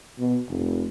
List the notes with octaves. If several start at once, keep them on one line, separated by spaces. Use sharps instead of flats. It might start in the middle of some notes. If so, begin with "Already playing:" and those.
B2
F1